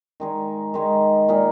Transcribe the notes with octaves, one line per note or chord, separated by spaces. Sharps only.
D#3 G#3 D#4 G#4
D#3 G#3 D#4 G#4
A#2 A#3 D#4 G#4